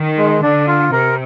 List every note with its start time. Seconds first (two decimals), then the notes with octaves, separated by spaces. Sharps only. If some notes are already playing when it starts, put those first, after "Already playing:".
Already playing: D#3
0.18 G#3
0.42 D3 D4
0.67 F4
0.92 C3 A#4